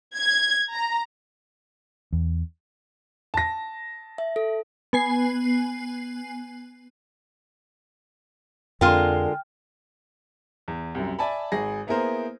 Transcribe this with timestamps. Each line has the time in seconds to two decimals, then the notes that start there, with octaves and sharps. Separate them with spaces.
0.16 G#6
0.73 A#5
2.13 E2
3.34 A5 A#6
4.18 E5
4.36 A4
4.93 B3 G#5 C7
8.81 F2 D3 G#3 C4 F4 A#4 G5 F6
10.68 E2
10.95 C2 F#2
11.19 D5 E5 G#5 A5 B5
11.52 G#1 G#4 A#6
11.87 A#3 B3 E4 G#4 A#4 C5